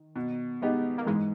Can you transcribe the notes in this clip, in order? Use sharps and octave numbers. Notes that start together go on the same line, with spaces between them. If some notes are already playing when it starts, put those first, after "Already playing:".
Already playing: D#3
B2
G#3 B3 D#4 G4
A#3
G#2 E3 G#3